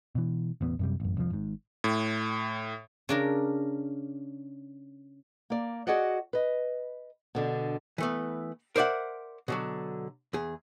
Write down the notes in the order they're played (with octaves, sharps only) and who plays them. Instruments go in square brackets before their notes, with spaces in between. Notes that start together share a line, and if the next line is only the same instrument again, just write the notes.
[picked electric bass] B2 E3
A1 E2 B2 B3
F#2 C3 G3
A1 F#2
C2 F2 E3 F3
G#1 G#2
[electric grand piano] A2
[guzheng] C#3 D4 A#4
[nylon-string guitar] A#3 D5
F#4 G#4 D5 D#5 F#5
B4 D#5
B2 D3 D4
[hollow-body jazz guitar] E3 A3 B3
A#4 C5 D5 E5 F#5
B2 D3 F#3
E2 G#4